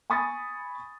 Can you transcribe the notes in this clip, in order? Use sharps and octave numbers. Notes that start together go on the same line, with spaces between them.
G#5 B5 C#6 D#6 A6